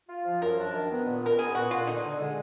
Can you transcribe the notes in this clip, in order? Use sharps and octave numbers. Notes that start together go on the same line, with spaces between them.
F4
F3
F#2 A#4
D4
D#3
B3
A#2
B3 A#4
B3 G#4
A#2 F#4
A#2 F4
D3 D#4
D3
G#3